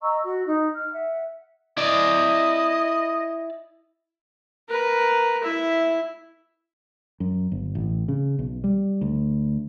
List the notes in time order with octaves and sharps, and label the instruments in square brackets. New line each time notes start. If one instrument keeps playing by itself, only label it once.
[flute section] D#5 A#5 C#6 E6
F#4
D#4
F6
E5 F#5
[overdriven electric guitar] E4 D5 [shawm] D#5
[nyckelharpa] A#4 B4
E4 E5
[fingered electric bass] F#2
G1
A1
C#3
B1
G3
D2